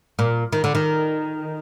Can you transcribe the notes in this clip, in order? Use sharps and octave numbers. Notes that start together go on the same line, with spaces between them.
A#2
D#3
D3
D#3